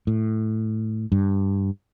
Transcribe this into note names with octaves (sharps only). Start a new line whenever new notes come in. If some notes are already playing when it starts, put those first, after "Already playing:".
A2
G2